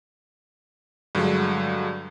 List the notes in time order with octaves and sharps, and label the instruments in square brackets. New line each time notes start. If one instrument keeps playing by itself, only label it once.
[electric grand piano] G2 D3 F#3 G#3